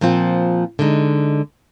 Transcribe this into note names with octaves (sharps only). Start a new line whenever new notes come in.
A#2 F3 C4 F4
D3 G#3 D#4